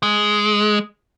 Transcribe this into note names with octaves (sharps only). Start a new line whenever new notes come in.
G#3